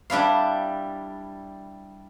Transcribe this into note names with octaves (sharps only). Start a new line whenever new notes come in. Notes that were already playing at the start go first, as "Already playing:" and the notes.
G3 D4 E4 F5